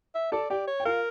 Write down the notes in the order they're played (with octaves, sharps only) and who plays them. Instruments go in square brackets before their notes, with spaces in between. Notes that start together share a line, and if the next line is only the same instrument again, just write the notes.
[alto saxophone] E5
[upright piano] A4 A5 [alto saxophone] D5
[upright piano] G4 G5 [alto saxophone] D5
[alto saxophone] C#5
[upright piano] G5
[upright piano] F4 F5 [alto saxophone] A#4